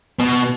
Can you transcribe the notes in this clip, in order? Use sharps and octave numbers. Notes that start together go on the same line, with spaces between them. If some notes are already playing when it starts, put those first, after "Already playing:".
B2